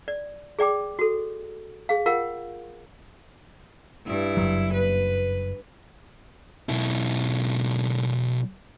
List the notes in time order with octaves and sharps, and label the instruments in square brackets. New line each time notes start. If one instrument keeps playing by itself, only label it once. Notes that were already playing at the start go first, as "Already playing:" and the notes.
[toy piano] D5
G#4 D5 G5 D6
F#4 A4
G#4 F5
F4 A#4 F5 F#5
[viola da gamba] G2 E4
[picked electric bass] F#1 B1 F#3
[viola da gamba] B4
[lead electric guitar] B1 E4